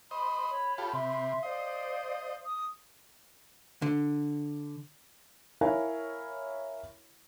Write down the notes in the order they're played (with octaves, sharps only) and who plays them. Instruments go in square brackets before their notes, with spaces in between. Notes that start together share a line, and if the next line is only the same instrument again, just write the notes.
[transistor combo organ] C5 D#5 [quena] B5
[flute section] C#5
[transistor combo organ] F4 G4 A4
[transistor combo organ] C3 [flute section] E5 C6
[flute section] C5 F5 [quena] D5 [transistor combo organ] D#5
[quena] D#6
[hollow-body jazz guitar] D3
[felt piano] E4 A#4 C#5 F5 G#5